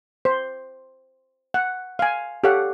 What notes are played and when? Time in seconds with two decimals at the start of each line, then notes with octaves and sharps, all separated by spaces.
0.25 C5
1.54 F#5
1.99 F5 G#5
2.44 G4 A4 C#5 F5 F#5